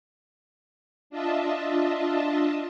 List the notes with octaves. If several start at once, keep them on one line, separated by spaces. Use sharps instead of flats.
D4 F4 D#5 E5 A5